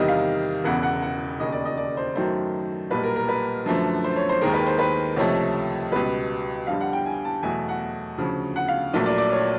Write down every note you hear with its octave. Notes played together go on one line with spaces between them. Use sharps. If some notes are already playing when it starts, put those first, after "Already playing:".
Already playing: E2 C3 D#3 G3 D#5
F5
E1 E2 C#3 E3 F#5
F#5
F#5
E1 D#2 C#3 D#5
D5
D#5
D5
C5
F#2 D#3 F#3 A3 C5
B1 A#2 G3 B4
A#4
A#4
B4
F#2 D3 F3 A3
C5
C#5
C5
D#2 D#3 G#3 A#4
B4
C5
B4
C#2 C3 F3 A3 C#5
C#2 B2 G3 B4
F2 D3 G3 F5
F#5
G5
G#5
A5
E2 B2 F#3 A3 G#5
F#5
D2 C#3 F3
F#5
F5
A#1 A#2 F#3 A3
D5
D5
C#5